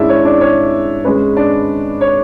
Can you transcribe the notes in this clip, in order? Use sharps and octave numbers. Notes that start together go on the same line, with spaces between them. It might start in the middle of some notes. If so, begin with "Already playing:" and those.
Already playing: G#2 G#3 C#4 D4 E4 D5 E5
C#5
D4 D5
C#5
G#2 G#3 C#4 B4
D4 D5
C#5